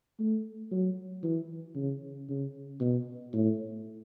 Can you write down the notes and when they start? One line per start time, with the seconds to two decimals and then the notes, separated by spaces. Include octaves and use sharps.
0.20 A3
0.72 F#3
1.23 E3
1.76 C#3
2.29 C#3
2.81 B2
3.33 A2